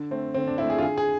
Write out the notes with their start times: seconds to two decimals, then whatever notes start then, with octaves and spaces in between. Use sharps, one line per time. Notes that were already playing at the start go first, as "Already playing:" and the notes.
Already playing: D3
0.11 A3 C4
0.34 D3 C4
0.47 D4
0.58 A3 C4 E4
0.70 G#4
0.78 F4
0.82 D3 G#4
0.98 G#4